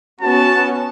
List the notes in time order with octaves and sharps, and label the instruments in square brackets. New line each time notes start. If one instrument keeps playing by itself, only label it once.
[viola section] B3 C#4 F#4 [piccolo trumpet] A5